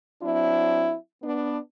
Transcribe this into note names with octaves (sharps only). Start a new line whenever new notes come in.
F#3 C4 D4 E4
B3 D4